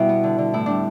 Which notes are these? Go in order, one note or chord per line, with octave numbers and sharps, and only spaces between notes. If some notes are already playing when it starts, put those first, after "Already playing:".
Already playing: B2 G3 E4
B3
D3
D3
A2 E4
G3 D4